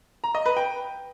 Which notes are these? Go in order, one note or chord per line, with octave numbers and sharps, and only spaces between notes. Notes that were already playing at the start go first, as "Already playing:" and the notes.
A#5
D#5
B4
G5